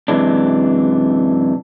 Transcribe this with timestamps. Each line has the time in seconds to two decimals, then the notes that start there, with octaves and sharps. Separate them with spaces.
0.08 F#2 C3 E3 G#3 D4